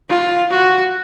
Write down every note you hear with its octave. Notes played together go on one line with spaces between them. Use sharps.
F4
F#4